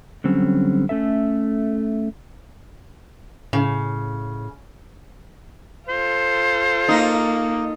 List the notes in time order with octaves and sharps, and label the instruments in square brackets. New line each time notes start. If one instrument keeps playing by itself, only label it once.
[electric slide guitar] D3 F#3 G3 C4 C#4
A3 C#4 A4 E5
[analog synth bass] A2 [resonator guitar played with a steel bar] C#3
[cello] F4 A4 [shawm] C5
[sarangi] A#3 [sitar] D#4